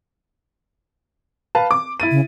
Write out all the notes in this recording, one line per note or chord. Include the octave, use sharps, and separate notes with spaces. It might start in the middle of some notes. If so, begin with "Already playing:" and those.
B4 F5 A5
D6
E4 A6 D#7
C#3